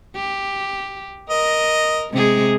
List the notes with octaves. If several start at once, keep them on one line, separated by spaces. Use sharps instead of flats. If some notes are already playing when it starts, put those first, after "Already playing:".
G4
A#4 D#5
C3 G#3 G#4